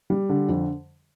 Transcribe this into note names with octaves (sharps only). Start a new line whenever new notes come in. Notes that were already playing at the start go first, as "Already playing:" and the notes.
G3
D3
F2